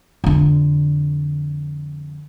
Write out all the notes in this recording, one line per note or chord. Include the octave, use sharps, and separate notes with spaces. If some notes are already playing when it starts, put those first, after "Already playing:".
F2 D3